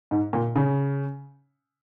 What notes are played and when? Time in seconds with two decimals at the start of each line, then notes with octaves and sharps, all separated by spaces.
0.11 G#2
0.33 A#2
0.56 C#3